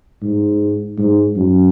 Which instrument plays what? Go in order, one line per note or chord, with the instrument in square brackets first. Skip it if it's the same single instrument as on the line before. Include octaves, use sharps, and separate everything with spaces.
[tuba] G#2
G#2
F#2